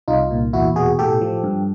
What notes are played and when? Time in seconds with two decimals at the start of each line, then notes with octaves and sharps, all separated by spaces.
0.08 C2 D#4 F4
0.31 A#2
0.53 E2 E4 F#4
0.76 B2 F#4 G#4
0.99 A2 G4 A4
1.21 F3
1.44 G2